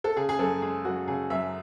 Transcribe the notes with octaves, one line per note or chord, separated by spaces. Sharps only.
A4
C#3 G#4
G#4
F#2 A4
G#3 G#4
F#2 F#4
C#3 G#4
F#2 E5